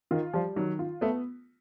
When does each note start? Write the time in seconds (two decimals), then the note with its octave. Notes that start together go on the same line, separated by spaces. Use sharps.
0.11 D#3 F4
0.33 F3 G3
0.56 D#3 F#3
0.79 F4
1.01 A3 B3